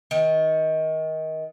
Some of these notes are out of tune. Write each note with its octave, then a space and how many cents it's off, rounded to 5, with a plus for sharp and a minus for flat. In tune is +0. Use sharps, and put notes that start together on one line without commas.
D#3 +25